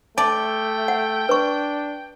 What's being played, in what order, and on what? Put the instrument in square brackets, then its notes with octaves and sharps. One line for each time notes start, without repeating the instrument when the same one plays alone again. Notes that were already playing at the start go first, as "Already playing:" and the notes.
[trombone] A3 [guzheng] D5 [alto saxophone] G5 [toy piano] A5
[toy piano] F#5
[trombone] D4 [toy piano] B4 C#6